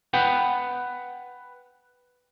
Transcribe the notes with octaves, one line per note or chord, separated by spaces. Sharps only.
B4 F#5 G5